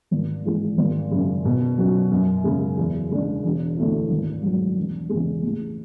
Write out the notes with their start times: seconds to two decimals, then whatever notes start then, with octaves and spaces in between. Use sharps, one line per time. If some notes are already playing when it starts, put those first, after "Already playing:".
0.11 G#1
0.46 G#2 E3 G#3
0.78 G#1
1.11 F#2 C#3
1.45 B2
1.78 F#3 C#4 F#4
2.11 F#2
2.44 C#3 G#3
2.77 E2
3.11 C#3 G#3 D4
3.44 E1
3.77 D2 D3 A3 E4
4.11 G#1
4.43 G#2 F#3
4.76 E1
5.09 E2 C#3 G#3
5.43 A1